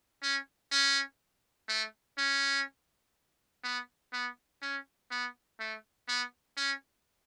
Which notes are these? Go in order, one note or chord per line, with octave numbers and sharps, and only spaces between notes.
C#4
C#4
A3
C#4
B3
B3
C#4
B3
A3
B3
C#4